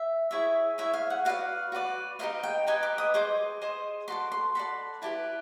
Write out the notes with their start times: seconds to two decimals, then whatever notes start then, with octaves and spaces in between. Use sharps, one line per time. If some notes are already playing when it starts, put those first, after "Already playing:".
Already playing: E5
0.31 E4 G#4 C#5 E5
0.78 E4 G#4 C#5 E5
0.94 F5
1.10 F#5
1.25 F#4 B4 D5 F5
1.72 F#4 B4 D5
2.19 D#4 G4 B4 D#5 F5
2.43 G5
2.67 D#4 G4 B4 D#5 G#5
2.83 D6
2.98 D#6
3.14 G#4 C5 D#5 D6
3.62 G#4 C5 D#5
4.08 F#4 A4 D5 C6
4.32 C6
4.55 F#4 A4 D5 B5
5.02 E4 G4 B4 D5 A5